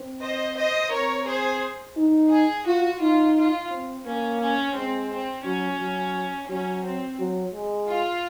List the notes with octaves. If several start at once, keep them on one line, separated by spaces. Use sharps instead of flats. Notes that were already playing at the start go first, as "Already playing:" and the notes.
Already playing: C4
C5 D#5
C5 D#5
C4 A#4 C#5
G#4 C5
D#4
G#4
F4 F#4
D#4 F4
F4
C4
A#3 C#4
C#4
G#3 C4
C4
F#3 C#4
F#3
F#3 C#4
C4
F#3
G#3
F4